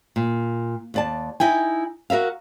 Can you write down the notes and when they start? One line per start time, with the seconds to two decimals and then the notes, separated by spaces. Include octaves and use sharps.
0.16 A#2
0.94 D#2 D5 A5
1.40 D#4 E4 G5 G#5
2.10 F#4 A#4 E5 F5